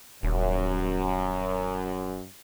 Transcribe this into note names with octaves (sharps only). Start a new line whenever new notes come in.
D#1 F#2